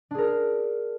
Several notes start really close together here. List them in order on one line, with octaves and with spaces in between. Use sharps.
D4 G#4 A#4